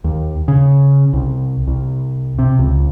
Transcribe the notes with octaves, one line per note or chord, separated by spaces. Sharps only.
D#2
C#3
C2
C2
C3
C#2